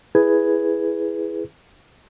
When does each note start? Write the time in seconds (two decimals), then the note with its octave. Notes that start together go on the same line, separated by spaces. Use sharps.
0.15 E4 G#4 B4 G#6